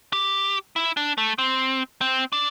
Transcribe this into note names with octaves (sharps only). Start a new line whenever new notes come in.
G4
E4
D4
A3
C4
C4
D4